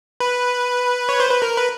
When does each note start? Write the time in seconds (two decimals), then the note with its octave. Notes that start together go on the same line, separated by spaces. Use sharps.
0.20 B4
1.09 C#5
1.20 C5
1.30 B4
1.42 A#4
1.57 B4